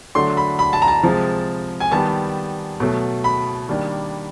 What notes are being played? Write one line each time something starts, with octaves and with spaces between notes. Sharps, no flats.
D3 F#3 A3 D4 C6
B5
B5
A5
A#5
A5
C3 F3 G#3
G#5
D#3 G3 B3 A5
B2 F#3 A3
B5
D#3 G3 A#3 D4